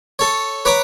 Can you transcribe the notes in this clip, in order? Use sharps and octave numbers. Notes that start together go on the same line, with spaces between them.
A4 C#5
B4 C#5 A#5 D6